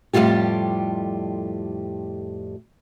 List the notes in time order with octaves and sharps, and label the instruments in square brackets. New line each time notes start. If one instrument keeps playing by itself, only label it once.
[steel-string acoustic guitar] F2 A2 G3 F4 G4